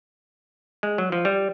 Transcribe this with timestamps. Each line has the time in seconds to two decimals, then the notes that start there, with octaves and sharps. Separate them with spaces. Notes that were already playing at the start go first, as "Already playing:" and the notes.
0.83 G#3
0.98 F#3
1.12 F3
1.25 G3